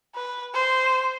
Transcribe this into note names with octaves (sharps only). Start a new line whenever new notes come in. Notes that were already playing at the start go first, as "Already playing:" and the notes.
B4
C5